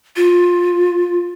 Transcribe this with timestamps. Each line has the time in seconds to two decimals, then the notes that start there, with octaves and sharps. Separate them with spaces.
0.16 F4